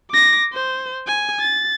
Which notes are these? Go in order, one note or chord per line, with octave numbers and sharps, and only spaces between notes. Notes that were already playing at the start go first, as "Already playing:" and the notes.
D6 A#6
C5
G#5
A6